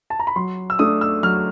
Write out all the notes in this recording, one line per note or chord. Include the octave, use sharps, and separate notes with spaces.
A5
A#5
B5
F#3 C6
E6
A3 D4 D#6
E6
F#3 F6